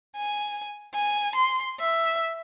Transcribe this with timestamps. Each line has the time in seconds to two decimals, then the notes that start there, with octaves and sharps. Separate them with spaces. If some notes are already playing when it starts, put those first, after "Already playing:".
0.16 G#5
0.95 G#5
1.35 C6
1.80 E5